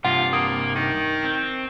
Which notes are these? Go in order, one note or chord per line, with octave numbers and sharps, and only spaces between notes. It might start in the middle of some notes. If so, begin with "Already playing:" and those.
G2 C3 F4 F#5
A#3 D#6
D#3
C4